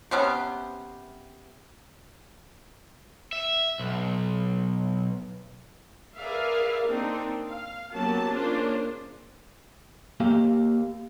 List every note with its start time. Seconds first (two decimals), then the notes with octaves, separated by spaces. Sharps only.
0.11 C3 B3 C#4 C5
3.33 E5
3.80 B1
6.15 G#4 A#4 B4 D5 E5 F5
6.84 A#3 C4 D4 D#4
7.46 F5
7.92 F#3 A#3 B3 C#4 G4 A5
8.30 A#3 C#4 D4 F4 G#4 C5
10.20 A#3 G4 F5